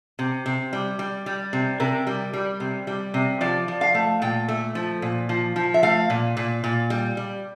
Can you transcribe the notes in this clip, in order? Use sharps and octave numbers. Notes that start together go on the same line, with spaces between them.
C3
C3
G3
G3
G3
C3
C3 A#4
G3
G3
C3
G3
C3
F3 D5
F3
F5
A3
A#2 G5
A3
F3
A#2
F3
F3
E5
A3 F5
A#2
A#2
A#2
G3
G3